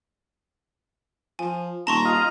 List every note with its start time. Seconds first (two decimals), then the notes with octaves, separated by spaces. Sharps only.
1.39 F3 G#5
1.87 D#1 A5 A#5 C6 C#6
2.05 F4 D#5